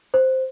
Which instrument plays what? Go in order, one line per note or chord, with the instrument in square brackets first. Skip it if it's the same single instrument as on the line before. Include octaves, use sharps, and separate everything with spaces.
[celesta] C5